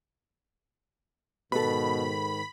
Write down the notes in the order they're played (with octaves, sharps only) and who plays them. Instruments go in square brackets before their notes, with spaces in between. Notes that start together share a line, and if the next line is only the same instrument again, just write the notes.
[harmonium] G#2 D#3 [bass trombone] B2 [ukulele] A4 B4 [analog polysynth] B5